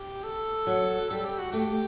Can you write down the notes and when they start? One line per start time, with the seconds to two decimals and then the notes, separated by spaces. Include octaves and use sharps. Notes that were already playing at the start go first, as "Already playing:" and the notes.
Already playing: G4
0.24 A4
0.67 F#3
1.10 G3 A4
1.25 G4
1.38 F#4
1.52 A3 G4